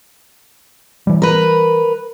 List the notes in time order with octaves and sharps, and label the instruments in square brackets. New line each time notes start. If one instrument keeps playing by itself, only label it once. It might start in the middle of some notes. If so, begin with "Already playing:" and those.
[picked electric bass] E3 G3
[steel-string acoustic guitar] A#4 B4